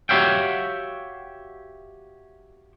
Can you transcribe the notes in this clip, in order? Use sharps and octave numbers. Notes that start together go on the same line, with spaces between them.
F#4 G4 C#5 E5 F5 G5